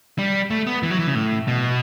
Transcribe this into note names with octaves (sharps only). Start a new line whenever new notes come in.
G3
A3
B3
E3
F#3
E3
C#3
A2
B2